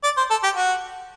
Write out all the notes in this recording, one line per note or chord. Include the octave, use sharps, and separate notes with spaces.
D5
C5
A4
G4
F#4